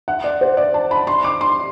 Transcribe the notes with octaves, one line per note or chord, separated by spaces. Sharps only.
F#5
D5
C5
D5
A5
B5
C6
D6
C6